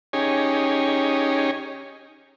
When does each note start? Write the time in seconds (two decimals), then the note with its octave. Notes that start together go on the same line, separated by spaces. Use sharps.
0.13 C#4 D#4 G4 G#4 C#5